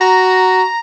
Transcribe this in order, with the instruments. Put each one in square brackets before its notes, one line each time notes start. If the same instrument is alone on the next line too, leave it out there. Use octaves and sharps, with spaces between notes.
[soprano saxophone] F#4 [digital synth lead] A#5